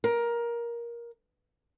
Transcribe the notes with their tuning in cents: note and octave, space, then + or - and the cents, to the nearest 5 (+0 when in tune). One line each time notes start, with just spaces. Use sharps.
A#4 +15